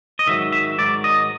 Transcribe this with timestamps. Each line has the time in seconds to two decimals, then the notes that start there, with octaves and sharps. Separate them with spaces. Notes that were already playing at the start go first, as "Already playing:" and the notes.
0.19 D#5
0.27 G#2 D#3 F#3 E5
0.52 E5
0.78 G#2 D#3 F#3 D5
1.04 D#5